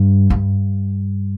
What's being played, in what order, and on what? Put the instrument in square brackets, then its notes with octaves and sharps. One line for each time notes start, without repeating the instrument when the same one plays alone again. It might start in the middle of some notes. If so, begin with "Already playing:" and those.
Already playing: [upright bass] G2
G2